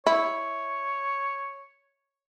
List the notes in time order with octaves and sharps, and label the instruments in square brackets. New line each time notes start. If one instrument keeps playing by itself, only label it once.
[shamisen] E4 [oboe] C#5